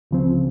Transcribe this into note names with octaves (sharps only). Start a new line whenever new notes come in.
C#2 C#3 F3 C4